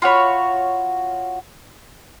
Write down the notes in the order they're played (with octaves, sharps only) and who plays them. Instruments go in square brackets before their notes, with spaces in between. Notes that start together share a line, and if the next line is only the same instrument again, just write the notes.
[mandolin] F4 F#4 C#5 B5